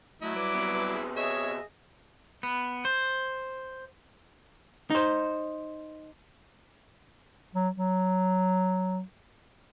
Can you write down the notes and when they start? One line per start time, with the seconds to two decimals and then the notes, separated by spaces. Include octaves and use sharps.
0.22 F#3 A3 E4 D#5
0.36 G3 B4 D6
0.54 C3 B3
0.94 G#4
1.16 G#4 C#5 D#5 E5
2.43 B3
2.85 C5
4.90 D#4 C5
7.55 F#3
7.76 F#3